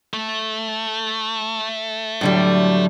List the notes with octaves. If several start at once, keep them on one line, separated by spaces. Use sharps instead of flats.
A3
A2 D3 F#3 G3